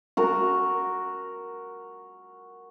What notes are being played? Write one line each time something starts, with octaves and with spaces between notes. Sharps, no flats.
F#4 A#4